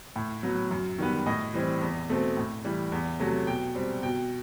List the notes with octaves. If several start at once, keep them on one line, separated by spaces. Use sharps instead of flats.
A2
F#3 B3
F#2
D#3 G3 B3
A2 D#5
E3 G3 C4
E2
B2 A3 C4
A2
E3 G3
E2
C3 F#3 A3
B2 G5
G3 C4
B2 G5